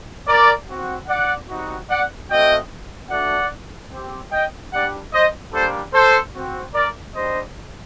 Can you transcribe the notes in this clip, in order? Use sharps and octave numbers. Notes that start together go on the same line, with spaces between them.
A#4 D5
C4 F#4
D5 F#5
G3 C4 D#4 F#4
D5 F#5
A3 C4 F#4 D#5 G5
A3 D4 F#4 D5 F#5
C4 G4
D#5 G5
G3 D4 G4 D5 F#5
C5 D#5
G3 A#3 D4 A4 C5
A4 C5
C4 F#4
A#4 D5
G3 D4 G4 C5 D#5